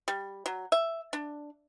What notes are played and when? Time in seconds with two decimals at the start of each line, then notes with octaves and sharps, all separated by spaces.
0.08 G3
0.46 F#3
0.72 E5
1.13 D4